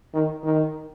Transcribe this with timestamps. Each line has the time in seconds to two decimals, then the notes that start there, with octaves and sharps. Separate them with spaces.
0.14 D#3
0.43 D#3